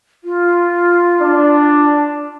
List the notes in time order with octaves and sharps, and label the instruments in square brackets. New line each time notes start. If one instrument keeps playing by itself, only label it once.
[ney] F4
[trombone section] D4